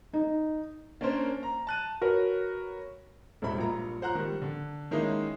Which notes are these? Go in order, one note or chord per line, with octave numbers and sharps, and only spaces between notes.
D#4
A#3 C#4 D4 A#4 C5
A#5
A5 F#6 D#7
F#4 A#4 B4 C#5
E1 G2 C4 E4 B5
A#1 G2 A#2 A#5
F3 C5 F#5 A#5 F#6
D#3 G3
D3
D#3 G#3 A#3 C#4 D#4 E4